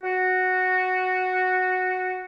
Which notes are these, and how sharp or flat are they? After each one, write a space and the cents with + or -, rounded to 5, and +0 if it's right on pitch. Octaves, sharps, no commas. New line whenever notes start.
F#4 -5